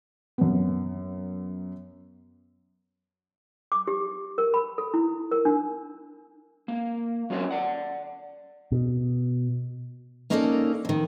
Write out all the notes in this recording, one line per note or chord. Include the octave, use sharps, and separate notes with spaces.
F#2 B3
D6
G4
A#4
B5
A4
E4
A#4
D4
A#3
F#3 C#4 F4 C#5 D#5
D5 F#5
B2
A#3 C#4 D#4 A4 A#4 D5
F2 D#3